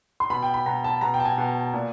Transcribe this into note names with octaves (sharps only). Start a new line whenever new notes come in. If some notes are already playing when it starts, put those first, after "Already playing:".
C6
B2 B5
G5
B5
B2 A#5
A5
B2 A#5
G5
A5
G#5
B2
A#2